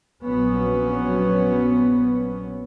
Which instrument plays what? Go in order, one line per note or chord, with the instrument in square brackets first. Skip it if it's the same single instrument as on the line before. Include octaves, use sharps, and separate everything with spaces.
[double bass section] A#1 F#3 B3 C#4